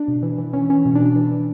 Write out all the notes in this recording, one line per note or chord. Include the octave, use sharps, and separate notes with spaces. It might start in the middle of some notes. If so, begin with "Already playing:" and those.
Already playing: D4
B2
E3
E3
E3 C#4
E3 C#4
B2
D4
B2
D4
E3
E3